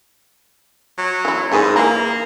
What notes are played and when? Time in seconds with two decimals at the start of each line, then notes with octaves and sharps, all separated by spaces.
0.98 F#3
1.25 E3 E4
1.52 G#2 E4 G#4 B4
1.76 E3 A#3 F5 A#5